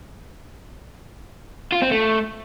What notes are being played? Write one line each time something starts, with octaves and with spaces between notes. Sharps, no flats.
F4
C4
A3